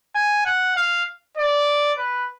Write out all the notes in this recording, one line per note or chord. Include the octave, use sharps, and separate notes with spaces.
G#5
F#5
F5
D5
B4